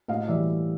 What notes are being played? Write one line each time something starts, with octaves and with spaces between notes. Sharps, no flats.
A2 D#5 F5
E3 G3 D5 E5